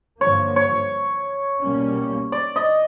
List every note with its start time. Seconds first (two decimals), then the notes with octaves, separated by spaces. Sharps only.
0.21 G2 D3 F3 A#3 C#5
0.56 C#5
1.61 B2 G3 A#3 C#4
2.32 D5
2.56 D#5